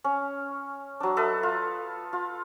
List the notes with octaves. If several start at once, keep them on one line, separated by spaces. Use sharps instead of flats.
C#4
F#3 D4
A4 B4 D#5 E5
F4
F4